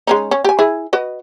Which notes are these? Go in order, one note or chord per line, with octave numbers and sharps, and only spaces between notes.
G#3 C#4 D#4
C#4
G4 G#5
E4 G#4
F#4 B4 D#5